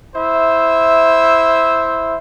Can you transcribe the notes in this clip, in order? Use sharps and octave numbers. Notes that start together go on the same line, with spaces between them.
E4 C5 E5